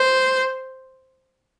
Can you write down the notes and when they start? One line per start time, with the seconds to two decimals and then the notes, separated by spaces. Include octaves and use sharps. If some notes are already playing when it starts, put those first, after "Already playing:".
Already playing: C5